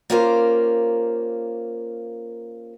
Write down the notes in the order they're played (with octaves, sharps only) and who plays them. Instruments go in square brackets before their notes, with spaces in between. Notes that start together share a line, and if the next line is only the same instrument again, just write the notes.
[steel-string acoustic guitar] A#3 C#4 F4 G4 A#4 C5